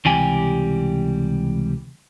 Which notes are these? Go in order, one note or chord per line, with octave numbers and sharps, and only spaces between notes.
C#2 C3 E3 G3 G4 G#5